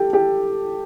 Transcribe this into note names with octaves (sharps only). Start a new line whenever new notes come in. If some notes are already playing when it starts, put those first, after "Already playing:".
Already playing: G4 A4
G4